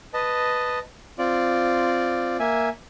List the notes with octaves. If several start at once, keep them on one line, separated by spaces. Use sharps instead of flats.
B4 D#5 A5
C4 F4 D5
A#3 E5 G#5